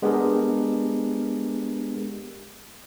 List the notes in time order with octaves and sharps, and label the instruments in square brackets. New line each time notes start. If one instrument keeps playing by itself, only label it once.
[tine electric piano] G#3 B3 D4 G4 G#4 A#4